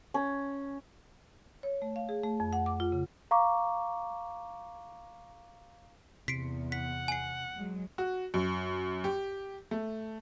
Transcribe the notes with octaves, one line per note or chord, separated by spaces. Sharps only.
C#4
C#5
A3
F5
G#4
A3
F2
F#5
D6
F4
C#3
F5 A#5 C#6 D6
E2 C3 B6 C7 D7
F#5 B6
G#5 C7
F#3 G#3
F#4
F#2
G4
A3